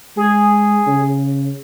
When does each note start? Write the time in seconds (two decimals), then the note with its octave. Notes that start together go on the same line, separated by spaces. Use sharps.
0.17 G#3 G#4
0.87 C#3